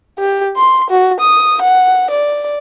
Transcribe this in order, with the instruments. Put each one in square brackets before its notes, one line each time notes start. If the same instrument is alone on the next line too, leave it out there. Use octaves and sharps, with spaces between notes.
[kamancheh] G4
C6
F#4
D#6
F#5
D5